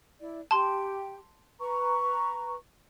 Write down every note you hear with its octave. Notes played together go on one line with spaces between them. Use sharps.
E4 D5
G4 A5 C6
B4 A#5 C#6